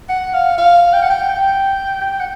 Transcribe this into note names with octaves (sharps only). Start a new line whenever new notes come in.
F#5
F5
F5
G5
F#5
G5
G5
G5
F#5